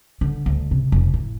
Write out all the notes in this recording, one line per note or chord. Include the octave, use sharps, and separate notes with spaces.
D3
D2
C3
F1
A2